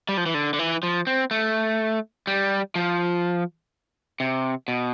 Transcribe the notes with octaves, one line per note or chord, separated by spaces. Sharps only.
G3
F3
E3
D3
D3
E3
F3
C4
A3
G3
F3
C3
B2